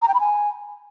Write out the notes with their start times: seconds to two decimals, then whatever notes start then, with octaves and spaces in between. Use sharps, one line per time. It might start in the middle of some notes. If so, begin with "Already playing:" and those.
0.02 A#5
0.08 G5
0.14 B5
0.20 G#5